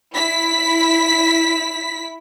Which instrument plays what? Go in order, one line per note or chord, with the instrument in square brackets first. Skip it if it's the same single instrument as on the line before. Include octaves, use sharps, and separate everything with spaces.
[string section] E4 B6